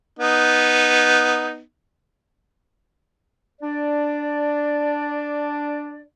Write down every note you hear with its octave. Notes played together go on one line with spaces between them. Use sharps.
B3 D#4
D4 D5